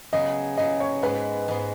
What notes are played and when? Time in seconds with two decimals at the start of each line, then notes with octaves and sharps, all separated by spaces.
0.13 C#3 F#3 B3 G#4 D#5
0.57 C#3 F#3 B3 G#4 D#5
0.80 C#5
1.03 G#2 G#3 B3 B4
1.48 G#2 G#3 B3